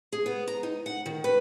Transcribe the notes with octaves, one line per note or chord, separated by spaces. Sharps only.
G#4
B3
A#5
D#4
F#5
D#3
B4